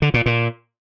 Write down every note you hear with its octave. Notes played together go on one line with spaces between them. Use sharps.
D3
A#2
A#2